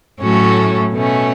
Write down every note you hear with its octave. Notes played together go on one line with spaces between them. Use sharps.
A2 F#3 A3 C#4 F#4
B2 A3 C#4